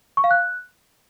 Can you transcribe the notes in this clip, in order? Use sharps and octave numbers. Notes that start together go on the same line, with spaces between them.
C#6
F5
F#6